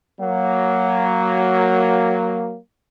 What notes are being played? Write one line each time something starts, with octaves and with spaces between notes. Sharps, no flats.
F#3 A#3